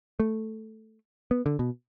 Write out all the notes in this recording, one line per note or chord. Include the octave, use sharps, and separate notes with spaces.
A3
B3
D3
B2